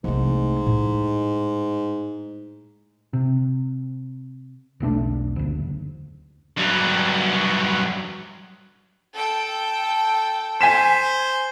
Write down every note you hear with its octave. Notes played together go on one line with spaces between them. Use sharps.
C2 G#2 A3
A2
C3
E1 B1 A3 D4
F#1 D2
G2 F#3
A4 G5
C5 G#5 B6 E7